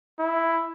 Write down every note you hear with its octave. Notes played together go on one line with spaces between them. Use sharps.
E4